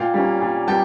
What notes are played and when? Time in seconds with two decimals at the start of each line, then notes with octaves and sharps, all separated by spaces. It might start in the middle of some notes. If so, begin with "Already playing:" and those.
Already playing: A#2 F5 G5
0.14 G3 A#3 C#4
0.41 A#2
0.68 G3 A#3 G5 A5